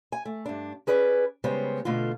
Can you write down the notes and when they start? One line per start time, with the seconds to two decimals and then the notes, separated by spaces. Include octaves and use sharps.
0.12 G#5
0.25 A3
0.46 G2 D4
0.87 C#4 G#4 B4 D5
1.44 C#3 G3 G#3 B3 C5 C#5
1.85 B2 D3 A3 F4